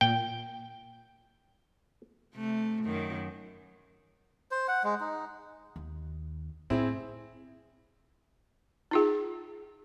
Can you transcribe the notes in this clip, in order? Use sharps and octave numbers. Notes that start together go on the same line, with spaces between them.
A#2 G5
C3 A3
F#2 D#3
C5
F#5
G#3
D#4
D#2
A2 C4 E4 G#4
D#4 F4 G#4